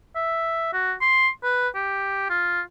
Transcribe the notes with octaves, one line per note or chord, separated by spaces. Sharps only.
E5
F#4
C6
B4
G4
F4